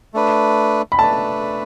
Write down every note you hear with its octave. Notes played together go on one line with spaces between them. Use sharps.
A3 D4 B4
B5
A3 D4 B4 A5